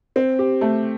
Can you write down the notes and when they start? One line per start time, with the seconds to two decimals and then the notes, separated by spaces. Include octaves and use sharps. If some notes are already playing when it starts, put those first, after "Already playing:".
0.16 C4
0.39 G4
0.61 A3